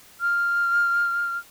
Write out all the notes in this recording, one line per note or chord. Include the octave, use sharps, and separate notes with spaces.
F6